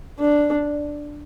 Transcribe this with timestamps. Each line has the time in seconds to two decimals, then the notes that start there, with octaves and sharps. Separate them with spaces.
0.20 D4